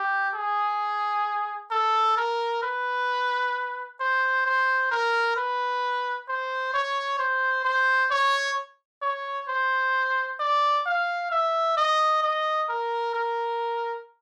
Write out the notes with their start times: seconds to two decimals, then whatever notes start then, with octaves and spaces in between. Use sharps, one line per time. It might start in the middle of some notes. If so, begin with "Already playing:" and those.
Already playing: G4
0.35 G#4
1.71 A4
2.17 A#4
2.63 B4
4.00 C5
4.46 C5
4.92 A#4
5.37 B4
6.29 C5
6.74 C#5
7.19 C5
7.65 C5
8.11 C#5
9.02 C#5
9.49 C5
10.40 D5
10.86 F5
11.32 E5
11.77 D#5
12.23 D#5
12.69 A#4
13.14 A#4